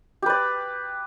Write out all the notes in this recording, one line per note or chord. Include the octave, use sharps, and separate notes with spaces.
G4 B4 D5